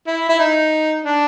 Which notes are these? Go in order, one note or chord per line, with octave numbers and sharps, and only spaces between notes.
E4
E4
D#4
D4